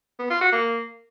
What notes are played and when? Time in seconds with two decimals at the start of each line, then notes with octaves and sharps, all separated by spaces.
0.19 B3
0.30 F4
0.41 F#4
0.52 A#3